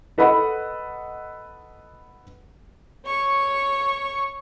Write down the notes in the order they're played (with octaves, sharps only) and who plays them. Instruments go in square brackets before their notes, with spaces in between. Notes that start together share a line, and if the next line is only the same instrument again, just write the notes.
[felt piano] A4 B4 D#5 F#5 B5
[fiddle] C#5 C#6